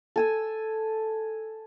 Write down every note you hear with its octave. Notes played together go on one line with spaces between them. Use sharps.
A4 G#5 E6